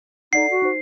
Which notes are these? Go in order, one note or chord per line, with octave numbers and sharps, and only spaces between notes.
D#4 A4 D5 F#5 C7
F#4
D#4 C5